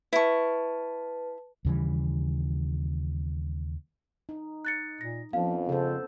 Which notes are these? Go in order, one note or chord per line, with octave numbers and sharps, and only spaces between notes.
E4 B4 A5 C#6
D#2 C#3 E3 G3
D#4
F#6 A6 C#7
A#2 A#6
F2 F3 B3 C#4 F5
C#3 A4 C5